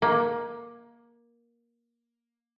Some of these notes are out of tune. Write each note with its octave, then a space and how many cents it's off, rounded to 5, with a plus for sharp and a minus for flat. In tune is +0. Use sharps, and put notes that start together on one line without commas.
A#3 +15